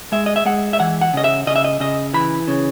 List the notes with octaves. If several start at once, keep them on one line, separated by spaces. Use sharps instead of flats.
G#3 E5
D#5
E5
G#3 F#5
E5
E3 F#5
F#5
C#3 D#5
E5
C#3 D#5
E5
D#5
C#3 D#5
E3 B5
C#3